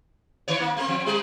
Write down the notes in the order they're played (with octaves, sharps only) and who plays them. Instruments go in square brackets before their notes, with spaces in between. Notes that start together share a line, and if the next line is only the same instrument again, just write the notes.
[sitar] D#3 C#5
A#3
A3 A#3 C4
F3 C4
G3